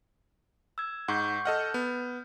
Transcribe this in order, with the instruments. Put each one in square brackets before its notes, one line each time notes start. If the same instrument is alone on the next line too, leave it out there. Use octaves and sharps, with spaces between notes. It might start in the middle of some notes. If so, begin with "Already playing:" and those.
[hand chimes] E6 G#6
[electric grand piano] G#2 [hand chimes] F#5 C#6 G6
[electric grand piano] A4 D#5 F#5 [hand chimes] F6 G6
[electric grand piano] B3